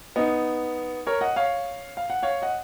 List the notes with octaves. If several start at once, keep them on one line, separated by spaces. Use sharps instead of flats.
B3 D#4
A#4 C#5
D#5 F#5
C#5 F5
F5
F#5
C#5 F5
D#5 F#5